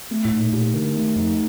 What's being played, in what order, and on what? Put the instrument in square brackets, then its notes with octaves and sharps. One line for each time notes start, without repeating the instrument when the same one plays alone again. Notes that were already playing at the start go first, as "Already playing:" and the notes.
[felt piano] A3
[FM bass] A2
[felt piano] D#4
[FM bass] A#2
[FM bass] A#2 [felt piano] G4
[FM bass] D3 [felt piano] A#4
[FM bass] D#3 [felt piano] A3
[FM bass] F2 [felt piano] D#4